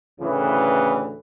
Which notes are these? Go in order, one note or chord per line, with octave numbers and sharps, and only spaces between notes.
D2 A2 C#3 E3 B4